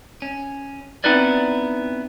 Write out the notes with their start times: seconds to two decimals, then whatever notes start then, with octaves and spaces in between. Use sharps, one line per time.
0.22 C#4
1.04 B3 C4 D#4 E4 B4 D5